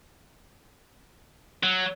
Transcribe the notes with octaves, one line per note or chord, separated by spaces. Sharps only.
F#3